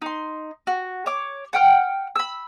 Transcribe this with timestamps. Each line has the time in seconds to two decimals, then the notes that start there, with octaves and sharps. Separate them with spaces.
0.02 D#4 C6
0.67 F#4
1.06 C#5 D6
1.53 F#5 G5 F6
2.16 B5 E6